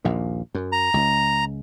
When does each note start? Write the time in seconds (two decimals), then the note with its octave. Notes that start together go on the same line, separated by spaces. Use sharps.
0.05 A#1 D#2 A#2
0.55 F#2
0.72 A#5
0.94 C#2